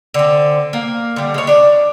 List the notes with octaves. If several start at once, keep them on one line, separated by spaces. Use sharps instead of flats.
D3 C4
A#3
D3 G3
G#3 C#5
D4 D5